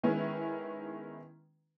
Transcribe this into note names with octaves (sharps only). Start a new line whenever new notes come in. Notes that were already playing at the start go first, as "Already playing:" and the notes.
D#3 G#3 B3 C#4 E4 B4